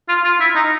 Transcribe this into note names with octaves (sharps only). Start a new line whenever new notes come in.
F4
F4
E4
D#4